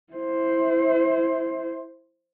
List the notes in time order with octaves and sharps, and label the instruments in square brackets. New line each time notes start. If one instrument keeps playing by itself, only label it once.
[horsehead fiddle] E4 C5